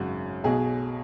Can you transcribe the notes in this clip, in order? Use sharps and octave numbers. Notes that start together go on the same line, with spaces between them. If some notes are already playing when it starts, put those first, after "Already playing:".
Already playing: G#1 F#2 C#3 F#4
B1 B2 G#4